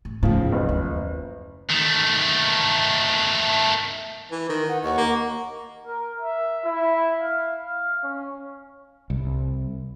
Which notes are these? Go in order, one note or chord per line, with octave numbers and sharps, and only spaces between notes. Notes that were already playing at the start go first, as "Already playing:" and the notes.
A2
D#2 A2 C#3 F3
F#1 B4
D#2
D#3 A3
E3
D#3
F#5
D#2 D#5 F#5 C#6
A#3
A#4
E5
E4
F5
F5
C#4
C2